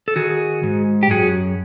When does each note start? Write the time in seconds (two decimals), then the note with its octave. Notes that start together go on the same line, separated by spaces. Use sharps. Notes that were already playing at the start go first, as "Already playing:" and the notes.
0.08 A4
0.16 D#3 F#4 G#4
0.63 G#2
1.03 G4
1.10 F#2 F#4 G#4